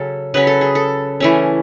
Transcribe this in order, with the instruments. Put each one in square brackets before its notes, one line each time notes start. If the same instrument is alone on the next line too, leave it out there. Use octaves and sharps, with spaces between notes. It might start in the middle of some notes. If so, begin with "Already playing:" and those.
Already playing: [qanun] C#3 F#3 C#4 A4
C#3 F#3 C#4 B4
A4
G#4
A4
E3 A3 C#4